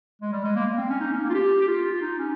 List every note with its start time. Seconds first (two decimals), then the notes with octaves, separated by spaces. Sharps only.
0.22 G#3
0.33 G3
0.45 G#3
0.56 A#3
0.67 A#3
0.78 C4
0.90 C#4
1.00 D#4
1.13 C#4
1.24 A#3
1.29 F4
1.34 G4
1.61 G4
1.68 F4
1.91 F4
2.02 D#4
2.19 C#4